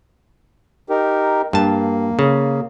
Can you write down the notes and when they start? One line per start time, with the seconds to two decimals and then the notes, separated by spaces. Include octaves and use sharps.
0.90 D#4 G4 A#4
1.53 G2 A#3 A5
2.19 C#3